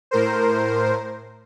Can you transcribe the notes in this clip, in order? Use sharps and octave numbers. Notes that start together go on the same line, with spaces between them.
A2 A#4 C5